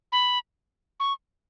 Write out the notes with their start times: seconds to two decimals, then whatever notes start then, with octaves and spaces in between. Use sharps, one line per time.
0.12 B5
1.00 C#6